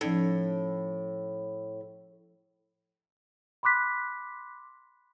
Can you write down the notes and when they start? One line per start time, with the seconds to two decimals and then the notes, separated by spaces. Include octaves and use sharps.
0.01 A2 F3 C#4 D#4
3.63 B5 C6 D6 F#6 B6